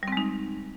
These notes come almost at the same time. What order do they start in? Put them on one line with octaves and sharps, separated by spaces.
G3 C4 G#3 D#4